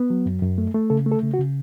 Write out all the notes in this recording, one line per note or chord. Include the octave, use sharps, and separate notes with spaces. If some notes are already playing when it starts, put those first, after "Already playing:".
Already playing: B3
F#3
F#2
F#2
A3
A3
C#3 A4
A3
A4
C#3
F#4
C#3